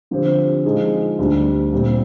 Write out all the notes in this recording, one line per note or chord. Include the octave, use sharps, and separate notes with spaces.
D3 F3 C4 G4 C5
F3 G#3 D#4 G#4
D2 D3 G3 D4
A#2 G3 C4